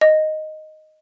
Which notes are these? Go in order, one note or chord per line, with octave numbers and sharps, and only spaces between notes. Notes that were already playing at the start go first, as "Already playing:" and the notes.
D#5